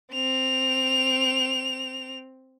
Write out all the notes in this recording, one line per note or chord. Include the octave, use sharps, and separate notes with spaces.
C4 F7